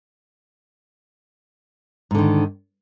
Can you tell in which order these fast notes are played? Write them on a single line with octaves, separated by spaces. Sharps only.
G#2 D3 D#3